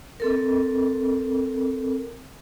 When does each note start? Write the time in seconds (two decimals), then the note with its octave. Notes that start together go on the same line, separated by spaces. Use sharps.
0.20 C4 A4 A#4